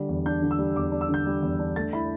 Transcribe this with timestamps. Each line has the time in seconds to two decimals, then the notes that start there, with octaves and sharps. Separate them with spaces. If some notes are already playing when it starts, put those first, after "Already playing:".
Already playing: D3 G3
0.09 E2
0.26 D4 G6
0.42 D3
0.51 E6
0.59 G3
0.76 E2 D6
0.92 D4
1.01 E6
1.09 D3
1.14 G6
1.26 G3
1.42 E2
1.59 D4
1.76 A3 A6
1.93 E4 B5